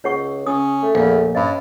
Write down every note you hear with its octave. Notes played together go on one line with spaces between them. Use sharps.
C#2 C#5 F#5 C#6
C#3 C#4 D#6
A3
A#1 E2 F5
G2 C#4 D#5 B5